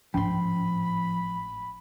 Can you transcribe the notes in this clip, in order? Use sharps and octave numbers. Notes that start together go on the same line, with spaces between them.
G#1 A2 F3 C#4 B5 C6